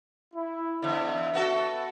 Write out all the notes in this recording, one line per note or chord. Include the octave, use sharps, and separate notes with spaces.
E4
E2 D3 E5
B3 F#4 A4